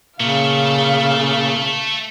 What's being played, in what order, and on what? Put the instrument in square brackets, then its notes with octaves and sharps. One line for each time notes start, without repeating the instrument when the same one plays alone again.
[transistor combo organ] A#2 [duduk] C#3 [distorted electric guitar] A3 [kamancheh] F5